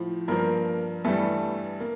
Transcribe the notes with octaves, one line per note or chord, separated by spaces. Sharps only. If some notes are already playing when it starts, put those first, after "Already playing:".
Already playing: A2 F3
G2 F3 A#3 A#4
G2 E3 G3 A3 A4
A#3